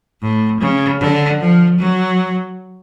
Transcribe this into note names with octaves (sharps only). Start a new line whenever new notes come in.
A2
C#3
D3
F3
F#3